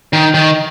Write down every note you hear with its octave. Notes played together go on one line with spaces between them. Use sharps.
D#3
D#3